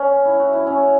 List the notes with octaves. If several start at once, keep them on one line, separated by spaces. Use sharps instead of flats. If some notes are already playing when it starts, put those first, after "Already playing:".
Already playing: C#4
E4
F#4
E4
C#4